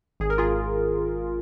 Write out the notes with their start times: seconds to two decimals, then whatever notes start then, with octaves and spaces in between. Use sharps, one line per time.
0.20 G#1 G#4
0.30 A#4
0.38 G#1 F4 G#4